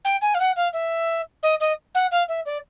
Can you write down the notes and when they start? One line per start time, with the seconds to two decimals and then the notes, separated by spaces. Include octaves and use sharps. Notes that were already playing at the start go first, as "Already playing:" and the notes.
0.04 G5
0.21 G#5
0.34 F5
0.39 F#5
0.56 F5
0.73 E5
1.42 D#5
1.60 D#5
1.94 F#5
2.11 F5
2.28 E5
2.45 D5